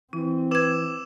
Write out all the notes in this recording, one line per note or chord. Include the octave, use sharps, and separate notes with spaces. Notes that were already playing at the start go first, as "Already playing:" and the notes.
E3 C4 E4
B4 D6 E6 G#6 E7